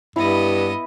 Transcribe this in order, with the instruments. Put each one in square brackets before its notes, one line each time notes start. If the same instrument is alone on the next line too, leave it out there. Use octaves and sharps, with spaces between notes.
[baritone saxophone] G2 [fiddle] B3 D#5 [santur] E4